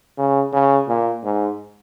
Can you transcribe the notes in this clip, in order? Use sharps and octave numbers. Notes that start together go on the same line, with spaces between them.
C#3
C#3
A#2
G#2